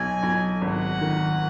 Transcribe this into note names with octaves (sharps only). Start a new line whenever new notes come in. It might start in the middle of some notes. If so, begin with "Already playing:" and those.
Already playing: B1 G#5
B1
G#1 F#5
D#3